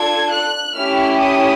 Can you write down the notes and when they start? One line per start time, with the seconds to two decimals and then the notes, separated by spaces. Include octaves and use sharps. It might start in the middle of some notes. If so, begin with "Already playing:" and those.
Already playing: D4 F4 A4 G#6
0.32 F#6
0.76 A3 C#4 E4 G4 F6
1.20 D#6